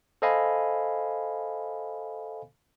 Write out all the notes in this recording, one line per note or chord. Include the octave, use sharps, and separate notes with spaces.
A4 C5 D#5 F5 G#5 B5